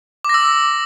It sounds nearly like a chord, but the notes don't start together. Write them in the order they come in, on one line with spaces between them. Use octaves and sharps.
D6 A#6 E6